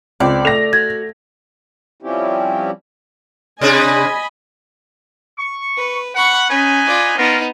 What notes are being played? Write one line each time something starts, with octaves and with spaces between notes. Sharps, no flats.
C#2 C4 D5
A3 A#6 F7
F#4 G#6
F3 G3 C4 C#4 E4 G4
C3 D4 G#4 D#5 G#5 B5
C#6
B4
F#5 B5 C#6
C#4 D#4 B4 G#5
F4 D5
B3 C#4 D#4 F4 A#4